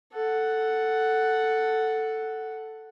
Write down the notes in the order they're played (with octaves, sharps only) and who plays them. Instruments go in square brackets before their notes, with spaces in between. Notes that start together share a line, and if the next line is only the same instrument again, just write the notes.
[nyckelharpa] A4 F#5